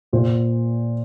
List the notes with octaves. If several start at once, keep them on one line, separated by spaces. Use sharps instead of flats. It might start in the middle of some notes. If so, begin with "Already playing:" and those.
A#2 A#3 F4 C5